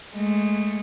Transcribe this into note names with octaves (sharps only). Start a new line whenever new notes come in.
G#3 A3